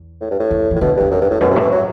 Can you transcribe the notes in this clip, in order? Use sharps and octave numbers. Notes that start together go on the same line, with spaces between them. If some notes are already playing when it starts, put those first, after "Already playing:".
Already playing: E2
A2
G2
A2
E2
A2 E3
B2 D3
E2 G2
F#2
G2
A2
F#2 B2
C3
A2 E3
F#3